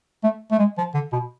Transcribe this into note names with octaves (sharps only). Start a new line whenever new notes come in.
A3
A3
G#3
F3
D3
B2